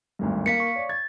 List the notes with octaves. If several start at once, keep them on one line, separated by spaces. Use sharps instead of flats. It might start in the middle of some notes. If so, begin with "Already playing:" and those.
G#1 D2 G2
A#3 F5 B6 C#7
C#6
C#5 D5
G#6 A6